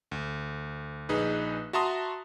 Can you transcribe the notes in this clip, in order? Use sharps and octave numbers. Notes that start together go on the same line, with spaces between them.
D2
A#1 D#4 G#4 B4
F#4 E5 A5 A#5 C6 D#6